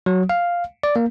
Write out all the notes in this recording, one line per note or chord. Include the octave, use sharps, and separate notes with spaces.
F#3
F5
D5
A#3